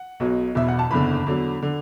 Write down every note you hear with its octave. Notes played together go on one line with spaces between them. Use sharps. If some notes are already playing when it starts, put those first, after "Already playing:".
Already playing: F#5
B1 B2 F#3
E1 E2 B2 E5
F#5
A5
F#1 E2 D3 B5
E2 D3 F#3
D3